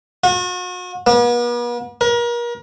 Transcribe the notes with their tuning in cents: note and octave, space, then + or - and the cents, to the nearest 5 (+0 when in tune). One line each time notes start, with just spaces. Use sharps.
F#4 -40
B3 -45
A#4 +35